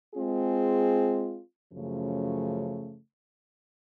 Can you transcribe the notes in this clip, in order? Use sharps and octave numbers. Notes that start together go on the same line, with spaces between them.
G#3 C4 F4 G#4
F#2 C#3 F3 A3